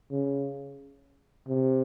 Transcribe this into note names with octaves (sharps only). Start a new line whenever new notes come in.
C#3
C3